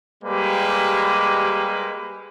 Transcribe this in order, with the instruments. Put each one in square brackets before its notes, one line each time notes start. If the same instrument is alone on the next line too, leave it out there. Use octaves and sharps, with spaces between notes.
[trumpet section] G3 G#3 A#3 G4 B4